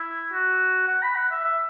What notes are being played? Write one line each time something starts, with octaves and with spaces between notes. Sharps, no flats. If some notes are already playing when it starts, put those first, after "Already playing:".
Already playing: E4
F#4
F#5
B5
F#5
E5
E5